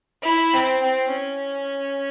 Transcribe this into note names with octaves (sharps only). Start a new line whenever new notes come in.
E4
C4
C4
C#4